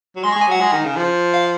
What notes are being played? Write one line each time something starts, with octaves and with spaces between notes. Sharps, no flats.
F#3
G#3 C6
C#6
G#3
G#5
F#3 F#5
G#3
D#3
C#3
F3
F5